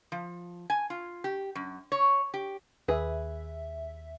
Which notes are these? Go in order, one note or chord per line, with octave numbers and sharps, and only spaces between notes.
F3
G#5
F4
G4
F#2
C#5
G4
D#2 G#4 B4 E5